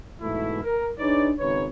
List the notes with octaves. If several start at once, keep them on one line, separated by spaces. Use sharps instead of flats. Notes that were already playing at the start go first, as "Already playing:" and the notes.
G#2 B2 E3 A3 E4
A#4
D4 D#4 G#4 B4 C#5 D5
G#1 C#3 D#4 B4 C#5